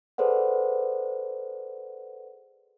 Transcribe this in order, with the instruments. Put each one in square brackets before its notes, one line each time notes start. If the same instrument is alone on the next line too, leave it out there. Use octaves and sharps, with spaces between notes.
[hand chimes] G#4 A4 B4 C5 D5 F#5